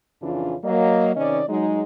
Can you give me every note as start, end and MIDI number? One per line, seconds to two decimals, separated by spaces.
0.22 0.55 41
0.22 0.55 49
0.22 0.55 52
0.22 0.55 61
0.22 0.55 62
0.22 0.55 65
0.64 1.12 54
0.64 1.12 58
0.64 1.12 75
1.16 1.42 48
1.16 1.42 51
1.16 1.42 61
1.16 1.42 74
1.16 1.42 75
1.49 1.83 54
1.49 1.83 56
1.49 1.83 63